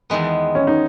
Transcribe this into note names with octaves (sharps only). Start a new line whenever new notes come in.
E2 D#3 G#3 B3
C#4
D#4